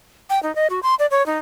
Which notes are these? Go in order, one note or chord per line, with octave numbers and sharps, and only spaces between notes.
G5
D#4
D#5
F#4
C6
D5
C#5
D#4